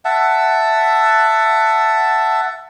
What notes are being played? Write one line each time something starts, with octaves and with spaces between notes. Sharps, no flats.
E5 F#5 A5